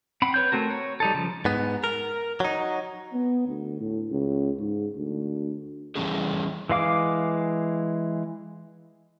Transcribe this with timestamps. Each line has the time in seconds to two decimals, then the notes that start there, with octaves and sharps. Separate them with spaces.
0.22 C4 F#5 B5
0.34 B4 C#5 G6
0.52 A3 C4 F#4 A#4
0.70 C#5
1.00 G3 D#4 A4
1.14 C#3 F3
1.45 G#2 B3
1.84 A#4
2.40 F#3 D#4
3.13 B3
3.48 D2
3.81 A2
4.11 C#2
4.59 G#2
4.97 D2
5.96 E3 F3 G3 C#4 E4 G#4
6.70 E3 G#3 F5 D6